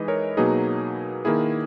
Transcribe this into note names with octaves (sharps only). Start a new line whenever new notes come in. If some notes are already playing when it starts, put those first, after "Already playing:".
Already playing: E3 G#3 D#4 B4 D#5
A#4 C#5
B2 F#3 A#3 D#4 G#4 B4
D#3 A#3 E4 G#4